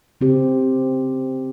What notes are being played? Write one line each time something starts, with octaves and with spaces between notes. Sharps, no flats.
C#3 C4 G4